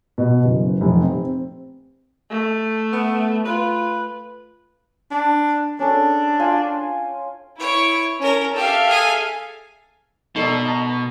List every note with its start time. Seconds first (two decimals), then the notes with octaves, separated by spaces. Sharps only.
0.18 B2
0.45 F#1
0.81 F1
1.02 C4
2.31 A3
2.93 B3
3.46 F4 B4
5.11 D4
5.79 C#4 D4 G#4 A4
6.39 F4 G5 G#5
7.59 E4 C#5 C#6 D7
8.22 C#4 A#4
8.56 G4 A4 E5 F5
8.89 G#4 G#5
10.36 B2 D#4 A4 D5
10.65 D#5 A5 A#5